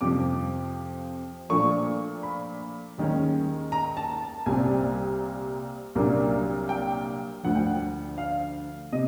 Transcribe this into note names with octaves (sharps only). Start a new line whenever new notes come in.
F2 C3 F3 D6
A#2 F3 A3 D4 C#6
B5
D#2 D#3 G#3 C#4
A#5
A5
A5
C2 A#2 G3 C4 G#5
C2 A#2 F#3 A#3 D4
G5
D2 D3 F3 F#5
G5
F#5
F5
C3 D#5